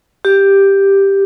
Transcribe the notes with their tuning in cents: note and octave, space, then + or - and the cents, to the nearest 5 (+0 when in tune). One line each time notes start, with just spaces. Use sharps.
G4 +5